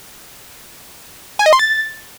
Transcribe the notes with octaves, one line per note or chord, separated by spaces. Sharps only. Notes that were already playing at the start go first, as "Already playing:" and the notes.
G#5
D#5
C6
A6